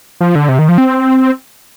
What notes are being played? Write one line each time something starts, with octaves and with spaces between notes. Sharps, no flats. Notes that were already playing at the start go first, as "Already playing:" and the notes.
F3
D3
C3
D#3
F3
C4